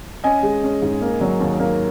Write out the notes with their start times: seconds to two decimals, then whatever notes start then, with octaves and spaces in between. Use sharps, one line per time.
0.24 C#4 D#5 G#5
0.43 G#3
0.64 C#4
0.82 G#2
1.01 A#3
1.21 F#3
1.40 D#2
1.60 A#3